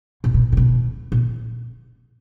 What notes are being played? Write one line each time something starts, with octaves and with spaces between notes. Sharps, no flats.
A#2
B2
A#2
B2
A#2